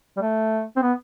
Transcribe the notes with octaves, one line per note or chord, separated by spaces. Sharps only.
G3
A3
C4
B3